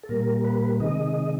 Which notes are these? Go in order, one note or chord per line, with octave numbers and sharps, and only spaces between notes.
A4
A#2 G3 A#3 A#4
B4
C3 D#3 G#3 D#5